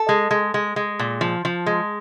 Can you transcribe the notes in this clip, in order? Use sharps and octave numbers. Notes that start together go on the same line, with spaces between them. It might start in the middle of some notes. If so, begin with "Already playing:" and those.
Already playing: A4
G#3
G#3
G#3
G#3
A#2
F3
F3
G#3